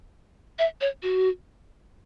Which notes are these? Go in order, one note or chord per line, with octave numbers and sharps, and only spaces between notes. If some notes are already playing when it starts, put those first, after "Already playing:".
E5
C#5
F#4